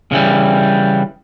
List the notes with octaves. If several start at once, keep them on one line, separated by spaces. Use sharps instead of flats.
C#3 E3 G3